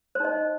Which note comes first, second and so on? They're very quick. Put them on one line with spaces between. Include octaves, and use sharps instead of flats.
C5 D#4 D#5